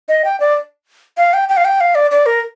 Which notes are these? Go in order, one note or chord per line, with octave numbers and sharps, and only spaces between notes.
D#5
G5
D5
F5
G5
G5
F5
G5
F5
D5
D5
A#4